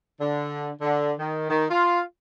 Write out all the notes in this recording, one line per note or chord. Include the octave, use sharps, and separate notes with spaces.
D3
D3
D#3
D#3
F4